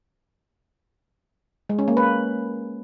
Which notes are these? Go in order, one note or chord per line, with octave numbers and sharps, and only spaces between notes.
G#3
C#4
A#3
B4